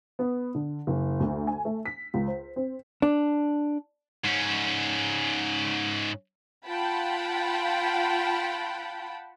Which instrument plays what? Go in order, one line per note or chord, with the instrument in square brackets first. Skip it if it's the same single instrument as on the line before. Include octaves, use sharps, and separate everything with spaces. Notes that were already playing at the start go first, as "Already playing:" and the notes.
[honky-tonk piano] B3
D3
F#1
D2
G#5
A3
B6
C#2
C5
C4
[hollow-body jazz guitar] D4
[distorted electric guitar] G#2 C#4
[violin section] F4 F#5 G5 A5 B5